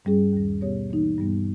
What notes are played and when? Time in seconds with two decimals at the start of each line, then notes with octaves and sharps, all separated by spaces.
0.05 G2 G3 C#4 G#4
0.33 D#2 D#3 G3
0.61 B2 G3 B3 G4 C#5
0.90 E3 A#3 D#4
1.18 G2 G3 B3